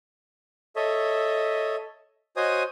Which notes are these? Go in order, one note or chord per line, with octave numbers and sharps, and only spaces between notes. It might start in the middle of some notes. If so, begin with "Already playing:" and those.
A4 C#5 D#5 E5
F#4 C5 C#5 D#5 G#5 D#6